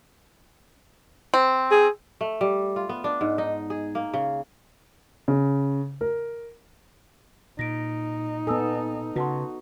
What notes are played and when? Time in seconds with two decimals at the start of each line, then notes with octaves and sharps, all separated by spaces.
1.34 C4
1.71 G#4
2.21 A3
2.41 G3
2.76 F4
2.89 B3
3.04 D4
3.21 G#2
3.38 D#4
3.70 G#4
3.95 A#3
4.14 C#3
5.28 C#3
6.01 A#4
7.59 A#2 D#4 A#6 D7
8.47 B3 A4 G#5 D#6 E6
9.16 C#3 F#4 B4 A5 C6